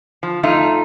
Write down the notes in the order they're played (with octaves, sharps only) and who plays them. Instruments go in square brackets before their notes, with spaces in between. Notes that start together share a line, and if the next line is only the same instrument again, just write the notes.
[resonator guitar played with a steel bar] F3
F2 A3 D#4 F4